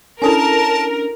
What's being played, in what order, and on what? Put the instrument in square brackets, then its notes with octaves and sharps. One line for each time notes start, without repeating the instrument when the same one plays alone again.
[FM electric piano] C#4 D4 [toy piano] E4 A4 G#5 [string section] A#4 [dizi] A5